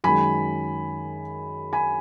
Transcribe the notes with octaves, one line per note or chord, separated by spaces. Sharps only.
F#2 D#3 G#3 G#5 B5
G#5 B5